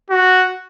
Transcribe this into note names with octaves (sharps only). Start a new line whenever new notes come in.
F#4